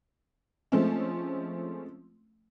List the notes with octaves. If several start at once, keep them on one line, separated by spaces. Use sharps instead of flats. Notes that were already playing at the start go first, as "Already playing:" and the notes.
F3 G#3 A3 C4 C#4